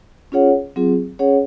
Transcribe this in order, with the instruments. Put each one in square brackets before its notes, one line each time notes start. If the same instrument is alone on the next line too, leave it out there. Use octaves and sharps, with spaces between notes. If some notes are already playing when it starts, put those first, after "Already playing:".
[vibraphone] C#4 F4 G#4 C#5 F#5
F#3 C4 F4 G#4
C#4 G#4 C#5 F#5